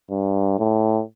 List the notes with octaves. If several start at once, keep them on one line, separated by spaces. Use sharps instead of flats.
G2
A2